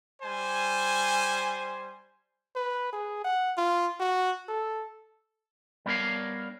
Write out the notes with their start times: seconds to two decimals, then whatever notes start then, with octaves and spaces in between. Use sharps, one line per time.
0.22 G3 C5 G#5
2.55 B4
2.93 G#4
3.25 F#5
3.58 F4
4.00 F#4
4.49 A4
5.86 G3 B3 D4 A#4 C#5 F5